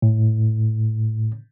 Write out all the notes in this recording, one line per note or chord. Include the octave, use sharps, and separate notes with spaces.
A2